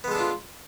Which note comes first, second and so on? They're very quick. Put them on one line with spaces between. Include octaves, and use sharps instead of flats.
B3 G#3 A4 D4 F4